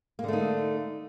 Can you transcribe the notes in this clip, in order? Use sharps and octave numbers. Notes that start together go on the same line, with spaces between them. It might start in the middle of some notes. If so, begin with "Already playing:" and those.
D3 A3 A#3 D#4